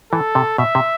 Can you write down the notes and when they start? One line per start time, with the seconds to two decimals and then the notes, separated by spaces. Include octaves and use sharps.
0.12 E3 A4
0.35 C3
0.58 B2 E5
0.75 C3